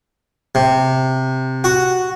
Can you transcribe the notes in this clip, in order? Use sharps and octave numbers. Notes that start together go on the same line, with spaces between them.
C3
F#4